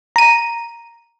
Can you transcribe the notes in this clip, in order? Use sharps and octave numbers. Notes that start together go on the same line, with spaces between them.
A#5 D#7